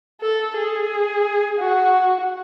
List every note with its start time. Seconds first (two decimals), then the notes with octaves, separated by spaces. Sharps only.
0.22 A4
0.56 G#4
1.59 F#4